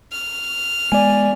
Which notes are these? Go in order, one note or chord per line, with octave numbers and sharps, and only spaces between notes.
F6
G#3 B3 D5 G#5